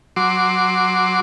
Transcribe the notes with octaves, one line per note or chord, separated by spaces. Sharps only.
F#3 C6 D6